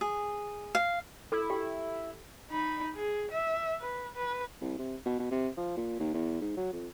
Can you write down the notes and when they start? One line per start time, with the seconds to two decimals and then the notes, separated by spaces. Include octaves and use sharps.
0.01 G#4
0.75 F5
1.32 E4 A4
1.50 G4 G5
2.50 D#4 B5
2.95 G#4
3.31 E5
3.81 B4
4.15 B4
4.61 C2
4.78 C3
5.05 B2
5.19 B2
5.31 C3
5.57 F3
5.77 A#2
6.00 D#2
6.14 E2
6.41 G#2
6.56 F#3
6.72 F2